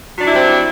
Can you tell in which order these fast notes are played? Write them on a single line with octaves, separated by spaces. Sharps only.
F#3 D4 E4 G3 C4